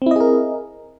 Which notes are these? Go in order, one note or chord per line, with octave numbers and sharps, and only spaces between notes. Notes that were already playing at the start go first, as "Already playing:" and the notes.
C4 E4 G#4 A#4 D#5